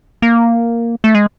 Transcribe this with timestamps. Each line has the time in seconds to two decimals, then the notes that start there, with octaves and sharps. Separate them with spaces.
0.22 A#3
1.04 A3
1.15 G#3